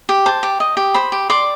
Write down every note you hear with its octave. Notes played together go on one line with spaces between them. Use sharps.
G4
C5 A5
G4
D#5
G4
C5 B5
G4
D5 C6